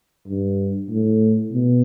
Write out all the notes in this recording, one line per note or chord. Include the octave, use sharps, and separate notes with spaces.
G2
A2
B2